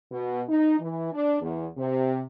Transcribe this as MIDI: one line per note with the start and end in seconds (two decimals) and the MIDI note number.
0.10 0.41 47
0.49 0.78 63
0.78 1.12 52
1.13 1.38 62
1.41 1.66 40
1.77 2.22 48